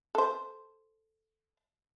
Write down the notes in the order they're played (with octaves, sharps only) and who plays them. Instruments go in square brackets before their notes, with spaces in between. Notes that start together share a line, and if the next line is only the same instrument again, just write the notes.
[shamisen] A4 C5